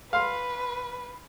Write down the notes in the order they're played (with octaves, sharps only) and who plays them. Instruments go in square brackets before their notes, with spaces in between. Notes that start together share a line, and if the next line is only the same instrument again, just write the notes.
[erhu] B4 [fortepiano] F5 C6